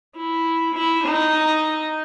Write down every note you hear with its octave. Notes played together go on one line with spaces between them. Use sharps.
E4
E4
D#4